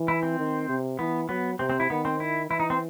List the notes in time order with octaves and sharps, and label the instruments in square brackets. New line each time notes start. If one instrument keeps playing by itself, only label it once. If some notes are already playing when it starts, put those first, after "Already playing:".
Already playing: [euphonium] E3
[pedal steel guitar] E4
C4
[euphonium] D#3
C3
[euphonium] E3 [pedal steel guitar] B3
[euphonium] F#3 [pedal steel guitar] B3
[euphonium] C3 [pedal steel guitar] C4
[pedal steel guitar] C4
E4
[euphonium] D#3 [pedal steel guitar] B3
[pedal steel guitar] C4
E4
[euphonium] E3 [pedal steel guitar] E4
[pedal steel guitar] D#4
C4